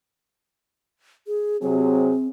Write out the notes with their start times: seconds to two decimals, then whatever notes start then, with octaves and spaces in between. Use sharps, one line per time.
1.27 G#4
1.62 C3 F#3 C4 G#4